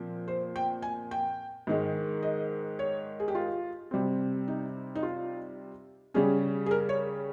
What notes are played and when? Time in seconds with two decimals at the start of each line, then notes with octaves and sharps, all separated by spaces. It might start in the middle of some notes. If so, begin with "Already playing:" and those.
Already playing: A#2 F3 C4
0.28 C5
0.56 G5
0.82 G#5
1.11 G5
1.67 G#2 D#3 G#3
2.23 D#5
2.79 C#5
3.20 G#4
3.28 G4
3.35 F4
3.91 C3 G3 C4
4.48 D#4
4.95 D#4
5.03 F4
6.14 C#3 G3 C#4 G#4
6.66 G#4
6.71 A#4
6.89 C#5